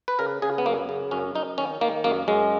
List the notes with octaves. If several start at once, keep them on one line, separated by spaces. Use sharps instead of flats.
B4
C#3 A#4
C#3 G#4
B3
F#2 A#3
C#3
F#2 C#4
F#2 D#4
D#3 C#4
D#3 A#3
F#2 A#3
F#2 G#3